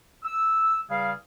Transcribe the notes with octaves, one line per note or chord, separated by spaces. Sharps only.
E6
E2 C#3 G3 G#4 F5